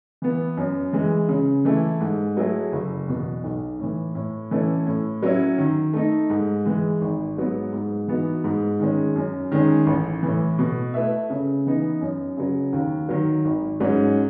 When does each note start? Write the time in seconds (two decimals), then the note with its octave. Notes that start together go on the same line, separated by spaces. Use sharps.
0.22 E3 B3
0.57 F#2
0.93 E3 G#3
1.29 C#3
1.65 E3 A3 E4
2.00 G#2
2.37 F#3 A3 E4 G#4
2.72 F#1
3.08 E2 B2
3.43 B1
3.79 A2 E3
4.15 A2
4.51 E3 A3 C#4 E4
4.86 A2
5.22 F#3 C#4 E4
5.58 D#3
5.93 A3 D#4
6.30 G#2
6.65 E3 G#3
7.01 G#1
7.37 G#2 F#3 B3
7.73 G#2
8.08 E3 B3 D#4 F#4
8.44 G#2
8.80 D#3 G#3 C#4
9.16 F#2
9.52 D#3 G#3 C#4 G#4
9.87 A1
10.23 A2 E3
10.59 B2
10.94 A3 E4 B4 E5
11.30 C#3
11.66 E3 B3 D#4
12.01 F#2
12.37 C#3 F#3
12.73 D#2
13.09 D#3 F#3
13.45 G#1
13.80 G#2 F#3 C#4